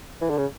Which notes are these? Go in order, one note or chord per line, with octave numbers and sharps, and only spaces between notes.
E3
D3
C#3